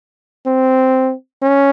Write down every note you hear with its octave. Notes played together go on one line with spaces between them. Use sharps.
C4
C#4